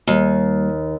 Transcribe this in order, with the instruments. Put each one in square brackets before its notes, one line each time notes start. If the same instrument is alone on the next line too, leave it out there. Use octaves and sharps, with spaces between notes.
[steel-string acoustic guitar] D#2 [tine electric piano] G3 A#3